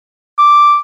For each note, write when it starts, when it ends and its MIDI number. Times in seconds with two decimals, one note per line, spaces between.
0.38 0.77 86